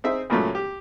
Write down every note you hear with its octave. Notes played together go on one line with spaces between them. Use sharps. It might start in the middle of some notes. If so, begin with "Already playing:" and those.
C4 D#4 G#4 E5
C#2 A#2 F#3 A3 C#4
G4